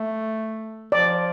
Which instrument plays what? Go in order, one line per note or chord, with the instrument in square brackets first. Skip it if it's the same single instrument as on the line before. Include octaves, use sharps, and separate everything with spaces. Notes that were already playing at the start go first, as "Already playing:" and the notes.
Already playing: [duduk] A3
[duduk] F3 [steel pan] D5